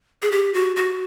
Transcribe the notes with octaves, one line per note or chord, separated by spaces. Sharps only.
G#4
G4
F#4
F#4